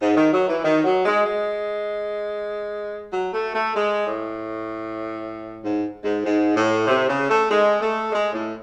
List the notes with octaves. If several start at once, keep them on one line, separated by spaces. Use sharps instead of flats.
G#2
D#3
F#3
E3
D#3
F#3
G#3
G#3
F#3
A3
A3
G#3
A2
G#2
G#2
G#2
A2
C3
C#3
A3
G#3
A3
G#3
A2